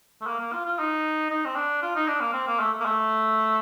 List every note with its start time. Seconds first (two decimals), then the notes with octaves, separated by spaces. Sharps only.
0.21 A3
0.26 A#3
0.40 A#3
0.52 F4
0.66 F4
0.79 D#4
1.30 D#4
1.45 C4
1.56 D4
1.82 F4
1.95 D#4
2.08 D4
2.20 A#3
2.33 C4
2.47 A#3
2.60 A3
2.80 A#3
2.85 A3